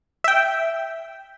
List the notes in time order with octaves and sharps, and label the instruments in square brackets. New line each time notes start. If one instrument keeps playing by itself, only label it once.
[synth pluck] E5 G5